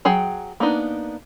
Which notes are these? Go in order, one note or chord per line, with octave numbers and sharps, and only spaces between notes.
F#3 G#4 F#5 G5
A#3 B3 D4 D#4